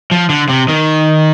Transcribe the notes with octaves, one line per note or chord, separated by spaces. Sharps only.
F3
D3
C3
D#3